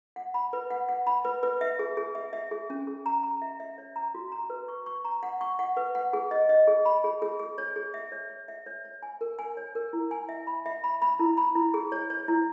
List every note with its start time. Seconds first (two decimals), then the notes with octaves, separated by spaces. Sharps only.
0.16 F#5
0.34 B5
0.53 B4
0.70 F#5
0.89 F#5
1.07 B5
1.25 B4
1.43 B4
1.61 E5
1.79 G#4
1.97 G#4
2.15 E5
2.33 E5
2.51 G#4
2.70 C#4
2.87 G#4
3.06 A#5
3.23 A#5
3.42 E5
3.60 E5
3.78 C#5
3.96 A#5
4.15 F#4
4.32 A#5
4.50 B4
4.68 C#6
4.86 C#6
5.05 A#5
5.23 F#5
5.41 C#6
5.59 F#5
5.77 B4
5.95 F#5
6.13 G#4
6.31 D#5
6.49 D#5
6.68 G#4
6.85 B5
7.04 G#4
7.22 G#4
7.39 G#4
7.58 C#5
7.76 G#4
7.94 E5
8.12 C#5
8.30 C#5
8.48 E5
8.66 C#5
8.85 C#5
9.02 G#5
9.21 A#4
9.39 G#5
9.57 C#5
9.75 A#4
9.93 E4
10.11 G#5
10.29 E5
10.47 B5
10.66 E5
10.84 B5
11.02 B5
11.19 E4
11.37 B5
11.55 E4
11.74 G#4
11.92 C#5
12.10 C#5
12.28 E4